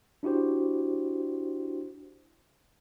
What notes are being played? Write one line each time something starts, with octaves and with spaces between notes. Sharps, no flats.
D4 E4 F#4 G4 C5